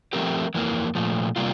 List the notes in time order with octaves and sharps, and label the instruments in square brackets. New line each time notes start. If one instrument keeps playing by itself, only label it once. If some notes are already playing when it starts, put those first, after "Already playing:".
[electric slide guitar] F3 A3 C4 G4 A#4
F2 E3 A#3
A#2 F3 A3
C3 G3 A#3 F4